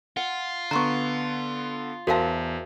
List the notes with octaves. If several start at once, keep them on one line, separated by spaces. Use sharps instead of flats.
F4 F#5
D3 B3 A#5 C6 C#6
E2 F#4 A#4 C5 E5 F5 A5